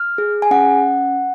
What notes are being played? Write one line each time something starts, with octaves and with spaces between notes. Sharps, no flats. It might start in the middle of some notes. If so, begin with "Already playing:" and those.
Already playing: F6
G#4
G#5
C#4 F#5